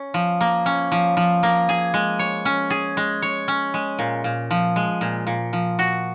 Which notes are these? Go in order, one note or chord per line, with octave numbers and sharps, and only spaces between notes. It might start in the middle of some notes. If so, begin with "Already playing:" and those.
Already playing: C#4
F3
A#3
C#4
F3
F3
A#3
G#4
G#3
C#5
C#4
G#4
G#3
C#5
C#4
G#3
A#2
A#2
F3
G#3
A#2
A#2
F3
F#4